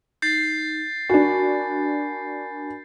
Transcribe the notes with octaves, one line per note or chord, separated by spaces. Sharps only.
D#4 G6 A6 C7
D4 F#4 A#4 G#5 B5